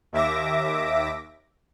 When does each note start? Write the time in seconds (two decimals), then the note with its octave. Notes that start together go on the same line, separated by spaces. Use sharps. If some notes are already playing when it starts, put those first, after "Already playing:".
0.12 D#2 E5 D6 A#6